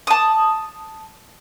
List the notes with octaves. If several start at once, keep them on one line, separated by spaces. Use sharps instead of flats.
A5 D#6